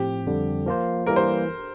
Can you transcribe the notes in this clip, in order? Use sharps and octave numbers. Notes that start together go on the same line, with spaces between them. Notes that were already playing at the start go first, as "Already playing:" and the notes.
Already playing: A2 F3 C4 G4
F2 D3 G3
F3 A#3 F4 C5
E3 G3 A#3 A#4
C5